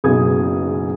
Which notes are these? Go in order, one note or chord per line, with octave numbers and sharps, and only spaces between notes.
F#1 B1 B2 G#4 D#6 G#6